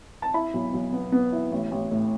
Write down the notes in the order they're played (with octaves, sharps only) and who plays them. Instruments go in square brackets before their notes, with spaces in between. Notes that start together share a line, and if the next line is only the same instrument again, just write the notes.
[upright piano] A5
E4 B5
B1
B1
B3
B3
E4
A1
A1
A2